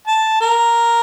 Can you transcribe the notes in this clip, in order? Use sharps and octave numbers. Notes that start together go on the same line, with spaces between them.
A5
A#4